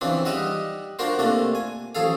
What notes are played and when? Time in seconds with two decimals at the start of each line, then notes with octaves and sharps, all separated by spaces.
0.01 C#3 E3 F3 C4 D4
0.25 G3 D#4 D#5 E5 F#5
0.99 D4 F4 F#4 A#4 C5
1.19 C3 A3 A#3 D4 F4
1.55 G#5
1.95 A1 F3 G#4 A4 F5